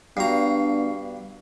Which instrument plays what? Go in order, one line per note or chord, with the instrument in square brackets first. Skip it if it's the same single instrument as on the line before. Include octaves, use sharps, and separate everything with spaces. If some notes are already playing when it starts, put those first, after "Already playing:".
[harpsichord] G2 A#5 [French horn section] B3 D4 [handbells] F#4 F5 C7